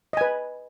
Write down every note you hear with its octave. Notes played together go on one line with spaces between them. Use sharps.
B4 D#5 G#5